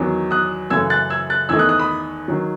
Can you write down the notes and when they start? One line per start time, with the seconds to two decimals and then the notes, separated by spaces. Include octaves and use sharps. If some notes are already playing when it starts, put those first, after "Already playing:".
Already playing: E2 D#3 F#3
0.31 D#6 F#6
0.70 F#2 C#3 E3 A3 E6 G#6
0.90 F#6 A6
1.10 E6 G#6
1.30 F#6 A6
1.49 E2 D#3 A3 D#4 E6 G#6
1.59 D#6 F#6
1.69 D#6 F#6
1.79 B5 D#6
2.28 D#3 F#3